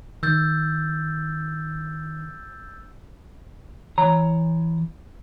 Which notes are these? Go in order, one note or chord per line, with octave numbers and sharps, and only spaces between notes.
D#3 E6 G6 A6
E3 C#5 A#5